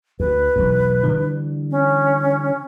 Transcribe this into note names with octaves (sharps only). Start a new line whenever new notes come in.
D2 B4
E1 B1 E2
D3 E3 G3
C#4